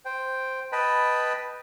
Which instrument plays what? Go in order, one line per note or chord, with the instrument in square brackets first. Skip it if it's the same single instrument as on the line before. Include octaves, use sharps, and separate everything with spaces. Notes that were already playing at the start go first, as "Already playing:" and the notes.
[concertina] C5 G5
B4 D#5 G5 A5 B5